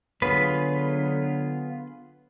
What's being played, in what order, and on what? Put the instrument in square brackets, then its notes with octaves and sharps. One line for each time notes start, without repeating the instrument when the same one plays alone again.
[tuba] D3 [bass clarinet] F#3 [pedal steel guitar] B3 F4 G#4 [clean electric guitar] B4